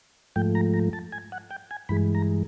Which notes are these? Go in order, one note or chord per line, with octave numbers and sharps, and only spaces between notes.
G#2 F3 A3 G5
A#5
A#5
A5
G#5
F#5
G5
G#5
G2 E3 G#3 B5
A#5